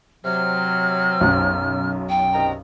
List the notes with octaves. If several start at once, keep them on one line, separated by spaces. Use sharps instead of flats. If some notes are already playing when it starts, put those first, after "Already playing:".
C3 F#3 F6
B1 F#2
G5
C2 D#3 A#5